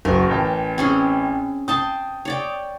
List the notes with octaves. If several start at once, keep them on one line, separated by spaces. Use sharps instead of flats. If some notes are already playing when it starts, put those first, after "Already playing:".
F#1 F#4 A#4
A1 G5 A5
C4 C#4 G#4
G5 A5 C6 D#6
C#5 D5 G5